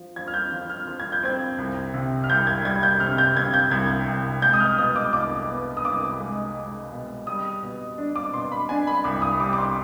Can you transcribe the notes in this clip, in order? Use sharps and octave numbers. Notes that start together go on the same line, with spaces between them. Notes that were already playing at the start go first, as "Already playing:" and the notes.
Already playing: F3
F3 G#6
F6
G6
F3
F6
F3
G#6
G6
C4 G#6
C2
C3
F6
C2 G6
G#6
G3 G#6
G6
C3 F6
G6
C3 G#6
G6
C2 G#6
C2
G#3 G6
D#6
F6
B2 D#6
D6
C2 D6
B3
D#6
C2 D6
G#3
G#3
B2
G3 D#6
B2
D4
D6
B2 C6
B5
D4 G#5
B5
C2 D6
D#6
G3 D6
D6
C6